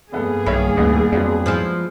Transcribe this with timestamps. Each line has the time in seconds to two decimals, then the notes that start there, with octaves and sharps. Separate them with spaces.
0.13 F1 G2 A#3 B3 G#4 A4
0.46 B1 D#3 C#5 E5 B5
0.77 A1 D2 B3
1.12 F2 F#3 B3 D4
1.46 F3 G#3 E4